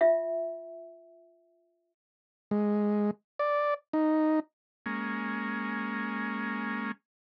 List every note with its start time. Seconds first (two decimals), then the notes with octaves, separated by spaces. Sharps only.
0.01 F4 E5
2.51 G#3
3.39 D5
3.93 D#4
4.86 G#3 A#3 C#4